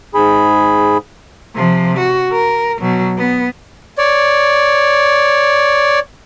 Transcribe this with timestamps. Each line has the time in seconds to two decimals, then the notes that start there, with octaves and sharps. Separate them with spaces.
0.15 G#2 G#4 B5
1.56 C3 F3
1.97 F#4
2.33 A#4
2.81 B2 F#3
3.18 B3
3.98 C#5 D5